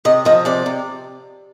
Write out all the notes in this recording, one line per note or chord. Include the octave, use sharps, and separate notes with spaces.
C3 D#5
F3 D#5
C3 D5
C3